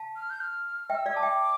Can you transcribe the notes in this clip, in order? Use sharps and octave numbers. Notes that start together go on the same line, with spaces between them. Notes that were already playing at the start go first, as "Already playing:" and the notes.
Already playing: F5 A5
F6
G6
F6
E5 G5 F6
E6
D5 F5
A5 D6
E5 G5